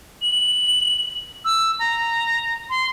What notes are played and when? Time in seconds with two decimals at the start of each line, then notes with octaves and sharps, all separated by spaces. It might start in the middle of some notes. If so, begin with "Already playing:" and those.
0.22 F#7
1.45 E6
1.79 A#5
2.70 C6